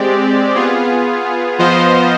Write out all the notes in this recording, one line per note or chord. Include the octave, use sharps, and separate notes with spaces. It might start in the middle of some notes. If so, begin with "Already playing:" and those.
Already playing: G#3 C4 G4 D5
B3 F4 G#4
F3 B3 F4 C5 D#5